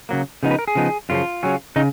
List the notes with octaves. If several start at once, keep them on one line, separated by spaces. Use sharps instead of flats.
C#3 F#3 A#3
C#3 F3 B3 D#4
B4
A#4
G#4
C#3 F3 B3 D#4
F#2 C#3 F3 F4
C#3 F#3 C#4
C#3 D#4